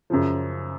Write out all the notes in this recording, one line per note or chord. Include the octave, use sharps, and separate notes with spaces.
F#2 C#3 F3